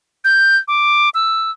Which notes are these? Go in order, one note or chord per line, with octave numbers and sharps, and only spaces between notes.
G6
D6
E6